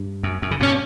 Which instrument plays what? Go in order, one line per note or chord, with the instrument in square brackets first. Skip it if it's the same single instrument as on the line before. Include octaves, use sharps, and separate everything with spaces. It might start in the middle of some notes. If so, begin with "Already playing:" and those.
Already playing: [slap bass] G2
F#2
F#2
C#3
[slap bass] G2 B2 [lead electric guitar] C#4